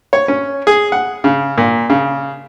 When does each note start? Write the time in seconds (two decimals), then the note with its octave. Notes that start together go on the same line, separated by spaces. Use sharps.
0.13 C#5
0.28 C#4
0.67 G#4
0.92 F#5
1.24 C#3
1.58 A#2
1.90 C#3